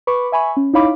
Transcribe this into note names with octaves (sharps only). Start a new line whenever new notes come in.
B4 B5 C#6 D6
E5 G#5 B5 C#6
C#4
D#4 E4 C#5 F5 B5 D6